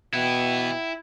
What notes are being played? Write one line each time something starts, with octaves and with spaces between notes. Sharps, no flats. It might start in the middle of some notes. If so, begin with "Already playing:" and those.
B2 E3 B3 E4 G5